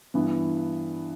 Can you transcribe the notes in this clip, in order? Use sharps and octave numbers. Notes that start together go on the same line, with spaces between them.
G2 E3 B3